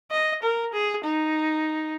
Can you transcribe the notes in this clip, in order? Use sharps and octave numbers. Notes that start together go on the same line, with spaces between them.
D#5
A#4
G#4
D#4